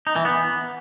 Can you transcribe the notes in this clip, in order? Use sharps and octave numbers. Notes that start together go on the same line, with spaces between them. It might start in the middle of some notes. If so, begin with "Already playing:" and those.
D#4
E3
B3